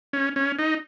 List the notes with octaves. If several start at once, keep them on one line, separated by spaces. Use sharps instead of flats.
C#4
C#4
D#4